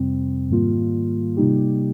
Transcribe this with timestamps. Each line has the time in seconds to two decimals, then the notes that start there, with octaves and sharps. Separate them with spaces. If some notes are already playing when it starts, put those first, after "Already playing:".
Already playing: F2 C3 G3 C4
0.50 G#2 D#3 G3 A#3 F4
1.37 C3 G3 A#3 D#4 G4